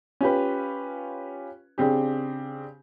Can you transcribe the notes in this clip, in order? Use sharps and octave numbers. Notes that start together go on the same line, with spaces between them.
C#4 F4 G4 B4
C#3 C4 D4 G4